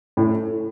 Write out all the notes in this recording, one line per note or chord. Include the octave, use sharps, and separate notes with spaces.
A2